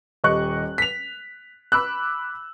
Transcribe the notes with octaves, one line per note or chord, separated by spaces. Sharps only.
D#1 G4 D#5 C#6 F#6
B6 F7
B5 D6 E6 F#6